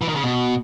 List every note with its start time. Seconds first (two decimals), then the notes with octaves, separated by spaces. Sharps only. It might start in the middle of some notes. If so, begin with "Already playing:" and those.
0.01 E3
0.09 D#3
0.16 C#3
0.24 B2